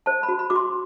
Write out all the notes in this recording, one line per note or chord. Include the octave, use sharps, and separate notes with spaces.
C5 A5
B5
F#4
B5
F#4 D6
C6